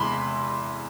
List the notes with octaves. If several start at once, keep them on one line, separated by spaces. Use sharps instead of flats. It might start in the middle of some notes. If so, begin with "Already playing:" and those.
Already playing: E2 C3 G#3 B5 C6